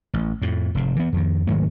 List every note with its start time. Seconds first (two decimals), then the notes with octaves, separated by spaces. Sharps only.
0.14 A1
0.42 F2 A2
0.75 F1 G#2
0.96 E3 B3
1.13 F2 D#3
1.47 G#2 D#3 F#3 A3